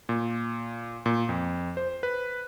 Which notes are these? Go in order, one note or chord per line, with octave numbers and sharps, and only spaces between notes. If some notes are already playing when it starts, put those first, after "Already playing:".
A#2
A#2
F2
C5
B4